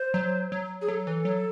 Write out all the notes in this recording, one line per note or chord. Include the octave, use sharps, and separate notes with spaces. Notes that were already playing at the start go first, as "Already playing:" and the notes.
Already playing: C5
F#3
F#3
G#4
F#3 A4
E3
F#3